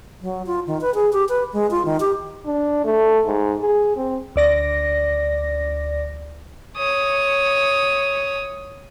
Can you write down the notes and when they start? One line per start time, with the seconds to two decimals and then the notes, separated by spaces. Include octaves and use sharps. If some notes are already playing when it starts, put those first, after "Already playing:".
0.21 F#3
0.46 F4
0.67 D#3
0.81 B4
0.94 G#4
1.13 G4
1.29 B4
1.53 G#3
1.71 F4
1.85 D#3
2.00 G4
2.45 D4
2.85 A3
3.26 G#2
3.61 G#4
3.97 C4
4.36 D2 D5 A#6
6.77 C#5 D#6